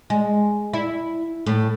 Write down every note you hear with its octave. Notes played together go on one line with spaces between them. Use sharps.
G#3
E4
A2